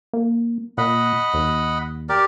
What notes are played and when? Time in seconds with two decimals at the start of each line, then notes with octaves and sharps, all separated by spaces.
0.13 A#3
0.78 A#2 D#5 F#5 B5
1.34 D#2
2.09 G4 A#4 D5